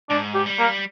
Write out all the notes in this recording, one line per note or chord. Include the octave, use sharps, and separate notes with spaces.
G#2 D4
G4
G3
A#3